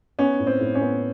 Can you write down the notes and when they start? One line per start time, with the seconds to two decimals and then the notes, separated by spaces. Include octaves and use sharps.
0.19 B3 C#4
0.39 A2
0.47 C4
0.60 A2
0.75 C#4
0.82 B3